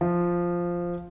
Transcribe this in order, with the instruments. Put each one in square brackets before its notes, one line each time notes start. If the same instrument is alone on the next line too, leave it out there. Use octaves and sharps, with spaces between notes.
[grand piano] F3